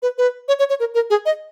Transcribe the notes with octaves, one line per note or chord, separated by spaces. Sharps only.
B4
B4
C#5
C#5
C#5
A#4
A#4
G#4
D#5